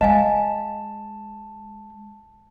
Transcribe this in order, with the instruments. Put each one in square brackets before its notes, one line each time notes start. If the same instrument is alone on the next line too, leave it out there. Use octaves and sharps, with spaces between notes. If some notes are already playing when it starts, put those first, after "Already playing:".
[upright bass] G#3 [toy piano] D#5 F5 G#5 [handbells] A5